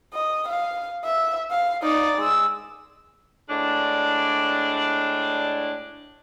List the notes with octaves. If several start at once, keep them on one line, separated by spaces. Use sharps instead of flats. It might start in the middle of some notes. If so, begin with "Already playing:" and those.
D#5
F5
E5
F5
D#4 D5
G#3 E6
A2 G#3 D4